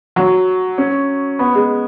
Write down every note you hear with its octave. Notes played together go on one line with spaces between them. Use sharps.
F#3
C#4
B3
G#3